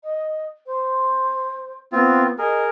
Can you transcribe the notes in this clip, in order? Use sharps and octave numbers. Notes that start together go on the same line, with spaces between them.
D#5
C5
B3 C4 F4
G#4 A#4 D#5